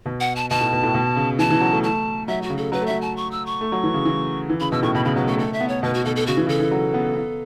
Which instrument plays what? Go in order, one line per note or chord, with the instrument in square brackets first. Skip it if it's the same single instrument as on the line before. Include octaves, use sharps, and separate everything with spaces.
[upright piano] B2
[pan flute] F#5
A5
[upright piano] B2 [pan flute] A5
[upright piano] A2
B2
A2
B2
C#3
[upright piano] E3 [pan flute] A5
[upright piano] E3
F#3
A3
[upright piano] A3 [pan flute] A5
[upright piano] F#3 [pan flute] E5
[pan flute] F#4
[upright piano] C#3
[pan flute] A4
[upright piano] F#3 [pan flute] B4
[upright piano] A3
[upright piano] F#3 [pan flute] E5
[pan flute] A5
C#6
E6
C#6
[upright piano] A3
F#3
E3
C#3
E3
E3
[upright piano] C#3 [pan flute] B5
[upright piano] B2 [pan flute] E6
[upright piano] A2 [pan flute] C#6
[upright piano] B2 [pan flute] B5
[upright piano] C#3 [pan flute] B5
[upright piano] F#3 [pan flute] B4
[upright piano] A3 [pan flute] A4
[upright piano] A3 [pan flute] A4
[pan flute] E5
[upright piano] B3
[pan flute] C#5
[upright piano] B2 [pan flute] B4
[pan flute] F#4
[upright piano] B2 [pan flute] A4
[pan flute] A4
[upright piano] C#3 [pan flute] F#4
[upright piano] E3
[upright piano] C#3 [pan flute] A4
[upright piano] E3
F#3
B3
B3